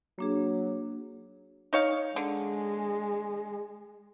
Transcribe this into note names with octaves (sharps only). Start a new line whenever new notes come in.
F#3 A#3 D4 G#4
D#4 C#5 F5
D3 G#3